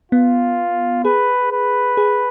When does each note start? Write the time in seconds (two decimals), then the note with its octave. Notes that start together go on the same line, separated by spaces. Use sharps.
0.12 B3 F4
1.05 G#4 B4
1.52 B4
1.97 G#4